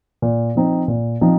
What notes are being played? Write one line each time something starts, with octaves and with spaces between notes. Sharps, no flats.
A#2
F3 C4 D#4
A#2
F3 C4 D#4